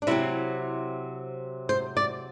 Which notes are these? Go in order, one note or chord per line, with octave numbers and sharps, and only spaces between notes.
D4
C3 F#3 C4 E4
C5
D5